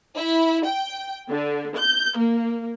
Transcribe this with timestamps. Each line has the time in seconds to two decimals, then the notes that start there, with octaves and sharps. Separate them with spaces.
0.18 E4
0.67 G5
1.29 D3
1.77 G6
2.18 A#3